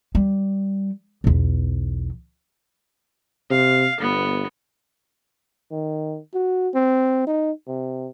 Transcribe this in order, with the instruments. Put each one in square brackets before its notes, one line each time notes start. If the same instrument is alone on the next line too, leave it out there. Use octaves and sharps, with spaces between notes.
[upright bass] G3
B1 E2
[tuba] C3 [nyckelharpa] F5
[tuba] G1 [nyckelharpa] B3
[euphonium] D#3
F#4
C4
D#4
C3